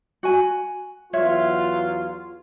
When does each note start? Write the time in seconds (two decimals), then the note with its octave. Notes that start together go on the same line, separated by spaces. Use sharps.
0.23 F#4 G#5
1.13 E2 F#3 F4 C#5 E5